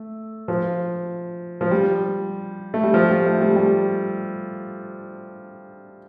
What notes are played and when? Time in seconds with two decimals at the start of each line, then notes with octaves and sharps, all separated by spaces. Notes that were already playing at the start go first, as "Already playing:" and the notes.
Already playing: A3
0.48 F3
1.61 F3
1.71 G3
2.74 A3
2.83 G3
2.94 F3
3.10 G3
3.26 A3
3.41 G3
3.56 G3